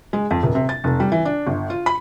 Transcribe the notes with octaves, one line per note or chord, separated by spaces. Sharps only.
G#3
F2
D#1
C3
A6
F1
G3
E3
D4
G1
F4
B5